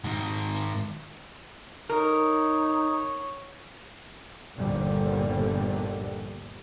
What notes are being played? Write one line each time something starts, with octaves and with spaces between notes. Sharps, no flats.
G#2 D#3
D#4 A#4 C#5
G1 D#2 A#2 D3 F3 G3